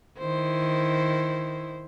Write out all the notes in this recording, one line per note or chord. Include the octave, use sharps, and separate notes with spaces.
D#3 E4 C5